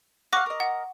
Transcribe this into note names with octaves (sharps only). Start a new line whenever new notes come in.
F5 F#5 C#6 D6 A#6
A#4 D#5
F#5